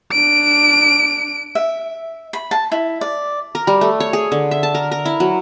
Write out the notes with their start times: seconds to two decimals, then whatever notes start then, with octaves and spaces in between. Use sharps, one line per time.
0.13 D4 D7
1.55 E5
2.33 B5
2.51 A5
2.72 E4
3.01 D5
3.55 A#4
3.67 G3
3.81 A3
4.00 C#5
4.13 G#4
4.32 D3
4.51 E5
4.63 A5
4.75 A#4
4.91 A#4
5.05 E4
5.20 F#3